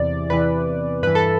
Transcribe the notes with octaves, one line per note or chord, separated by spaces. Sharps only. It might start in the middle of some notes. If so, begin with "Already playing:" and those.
Already playing: E2 C3 E3 D5
E2 C3 E3 B4
G2 E3 B4
A4